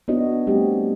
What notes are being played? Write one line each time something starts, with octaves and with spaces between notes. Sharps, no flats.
B3 D4 E4 F#4 C#5 D#5
G3 A3 C4 G4